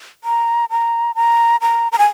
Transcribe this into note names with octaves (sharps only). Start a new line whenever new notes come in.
A#5
A#5
A#5
A#5
A#5
G#5